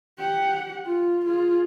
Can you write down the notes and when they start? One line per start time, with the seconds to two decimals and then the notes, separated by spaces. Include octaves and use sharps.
0.18 G4 F#5
0.85 F4
1.25 F4 G#4